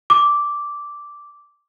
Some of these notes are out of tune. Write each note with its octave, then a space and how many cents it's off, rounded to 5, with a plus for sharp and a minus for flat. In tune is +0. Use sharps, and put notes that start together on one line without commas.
D6 -5